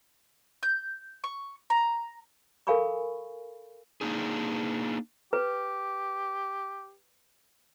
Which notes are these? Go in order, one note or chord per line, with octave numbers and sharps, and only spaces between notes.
G6
C#6
A#5
A4 A#4 F5 G#5 B5 C#6
A#3 D4 D#4 G#4
G4 B4